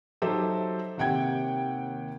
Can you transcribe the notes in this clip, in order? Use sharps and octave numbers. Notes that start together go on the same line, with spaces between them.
F#3 D#4 G4 A4 C5 E5
D#2 C3 F#5 G5 G#6